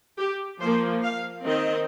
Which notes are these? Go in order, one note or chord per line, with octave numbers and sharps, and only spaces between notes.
G4
F3 A#3 C5
F5
D#3 C4 D#5